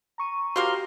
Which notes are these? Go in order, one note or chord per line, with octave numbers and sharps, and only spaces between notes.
A#5 C#6 D#7
F3 A#3 F#4 G4 A#4 C6 A#6